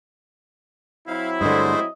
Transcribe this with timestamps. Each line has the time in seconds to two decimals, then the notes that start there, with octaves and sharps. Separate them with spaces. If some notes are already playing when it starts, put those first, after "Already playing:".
1.08 F#3 C4 E4 F5
1.41 G2 D3 G#3 A3 C5 D#5